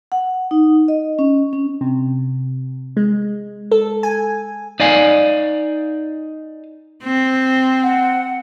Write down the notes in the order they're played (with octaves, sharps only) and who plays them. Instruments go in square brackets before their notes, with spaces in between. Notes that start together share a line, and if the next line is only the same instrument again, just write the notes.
[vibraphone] F#5
D#4
D#5
C#4
C#4
[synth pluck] C3
G#3
A4
G#5
[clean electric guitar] D#4 D5 F5 G#5
[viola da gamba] C4
[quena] F#5